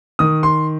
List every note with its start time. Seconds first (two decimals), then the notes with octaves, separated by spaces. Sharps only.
0.19 D#3 D#6
0.43 C6